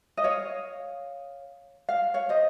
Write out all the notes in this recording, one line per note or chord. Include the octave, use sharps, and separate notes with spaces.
D#5
C#5 F5
F5
C#5 F5
C5 D#5